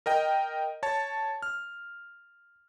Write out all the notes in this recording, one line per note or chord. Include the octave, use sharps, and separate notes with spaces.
A#4 D#5 G5
C#5 A5
F6